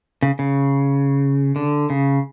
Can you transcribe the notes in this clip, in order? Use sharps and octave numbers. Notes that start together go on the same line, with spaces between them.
C#3
C#3
D3
C#3